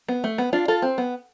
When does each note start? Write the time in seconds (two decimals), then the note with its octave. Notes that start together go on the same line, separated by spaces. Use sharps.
0.08 B3
0.24 A3
0.38 B3
0.53 D4 F4
0.68 F4 A4
0.82 C4
0.98 B3